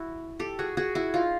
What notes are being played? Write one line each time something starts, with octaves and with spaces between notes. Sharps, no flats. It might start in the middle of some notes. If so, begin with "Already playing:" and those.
Already playing: E4 F#4
G4 A4
F#4 G#4
F#4 G#4
E4 F#4
D#4 F4